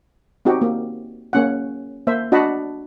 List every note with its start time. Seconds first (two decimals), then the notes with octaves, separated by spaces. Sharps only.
0.45 C4 D#4 F#4 G4
0.61 A#3
1.33 A#3 C#4 F#5
2.07 A#3 C5 E5
2.32 D4 F#4 D#5 F#5 A5 B5